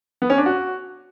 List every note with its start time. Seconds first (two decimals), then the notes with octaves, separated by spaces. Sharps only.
0.22 B3
0.30 C#4
0.38 D4
0.46 F#4